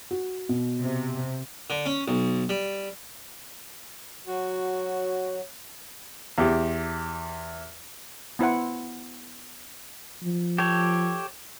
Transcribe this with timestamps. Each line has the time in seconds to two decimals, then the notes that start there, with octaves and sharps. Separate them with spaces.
0.11 F#4
0.49 B2
0.81 C3
1.70 D3
1.86 C#4
2.08 B1
2.49 G3
4.27 F#3 F#4
6.38 E2 G4
8.39 B3 E4 C5 F#5
10.23 F3
10.58 G4 A4 C#5